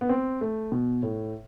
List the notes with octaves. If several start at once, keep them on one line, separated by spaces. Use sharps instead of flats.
B3
C4
A3
B2
A2